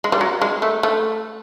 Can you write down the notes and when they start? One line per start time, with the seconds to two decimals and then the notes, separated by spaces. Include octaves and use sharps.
0.04 G#3
0.12 G3
0.21 F#3
0.41 G#3
0.62 A3
0.83 A3